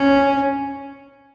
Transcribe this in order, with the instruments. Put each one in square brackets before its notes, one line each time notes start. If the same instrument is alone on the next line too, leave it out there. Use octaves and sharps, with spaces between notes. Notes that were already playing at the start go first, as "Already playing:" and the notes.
Already playing: [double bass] C#4